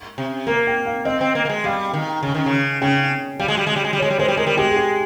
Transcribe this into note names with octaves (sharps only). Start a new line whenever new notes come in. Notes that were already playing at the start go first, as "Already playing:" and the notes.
C3
A#3 A#4
G5
F5
C4 D#5
C4
A#3
A#3
G#3
G3 F5
D#3
C#3
D#3
C#3
C#3 G5
G3 F5
G#3
G3
G#3
G3
G#3
G3
G#3 C#5
G3
G#3 C5
G3
G#3 A#4
G3
G#3 G4
G#4
G4